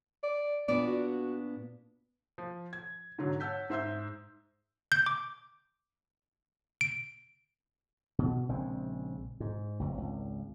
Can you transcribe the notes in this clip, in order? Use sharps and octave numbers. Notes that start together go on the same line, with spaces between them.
D5
A#2 B3 D4 D5
F#4
F3
G#6
G#2 D3 F#3
C#5 F#5 A5 E6 G6 B6
G#2 C5 E5 C6 E6 G6
G6
D6
D7
B2
A#1 C#3 G#3 C4
G#2
F1 C#2
G#1 C#2